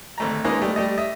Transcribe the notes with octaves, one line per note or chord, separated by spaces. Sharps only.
G#1 A3 A#5
G#3 A#3 B3 C#4 D#4 F4
G3 A3
G3 A3 D#5
D#5 E5